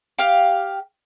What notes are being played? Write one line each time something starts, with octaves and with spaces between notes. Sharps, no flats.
G4 F5